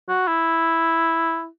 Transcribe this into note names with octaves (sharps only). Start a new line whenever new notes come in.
F#4
E4